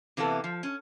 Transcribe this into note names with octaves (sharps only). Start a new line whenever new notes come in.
C3 E3 A#3 B3 A4
F3
C#4